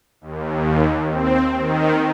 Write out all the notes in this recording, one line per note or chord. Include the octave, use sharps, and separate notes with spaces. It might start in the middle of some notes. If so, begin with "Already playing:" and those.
D#2
C4
D#3